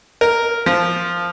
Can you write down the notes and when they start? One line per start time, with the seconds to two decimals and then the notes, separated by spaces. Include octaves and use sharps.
0.21 A#4
0.66 F3